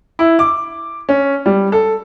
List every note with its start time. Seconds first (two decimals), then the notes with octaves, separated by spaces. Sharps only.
0.19 E4
0.39 D6
1.09 C#4
1.46 G3
1.72 A4